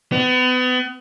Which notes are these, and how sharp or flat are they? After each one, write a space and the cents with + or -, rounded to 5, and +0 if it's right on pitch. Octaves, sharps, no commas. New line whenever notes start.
B3 +35